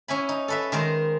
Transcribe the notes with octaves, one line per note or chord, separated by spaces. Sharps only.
C#4 E4 G#5 B5
D#4
A4 B4 E5
D#3 G#3 A#4 C5